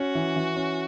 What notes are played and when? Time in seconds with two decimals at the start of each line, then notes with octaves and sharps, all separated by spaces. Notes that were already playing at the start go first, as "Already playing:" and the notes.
Already playing: C#4 F#4
0.15 E3
0.36 E3
0.56 C#4